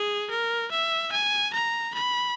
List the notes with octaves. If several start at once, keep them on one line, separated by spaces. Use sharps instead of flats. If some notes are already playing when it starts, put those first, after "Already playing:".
Already playing: G#4
A#4
E5
G#5
A#5
B5